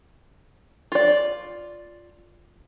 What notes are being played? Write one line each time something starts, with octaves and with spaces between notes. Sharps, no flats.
F4 D5